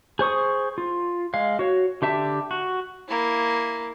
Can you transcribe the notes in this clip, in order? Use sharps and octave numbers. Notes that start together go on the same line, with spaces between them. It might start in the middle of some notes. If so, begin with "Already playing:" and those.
G#4 C5 C#6 D#6
F4
G#3 F5
F#4 C#5
D3 G4 E5 A5
F#4
A#3 E4